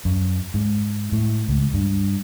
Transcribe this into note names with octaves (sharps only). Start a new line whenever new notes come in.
F#2
G#2
A2
C#2
G2